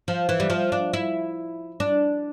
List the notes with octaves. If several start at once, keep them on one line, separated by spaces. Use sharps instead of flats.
F3
E3
G3
F3
D4
E4
D4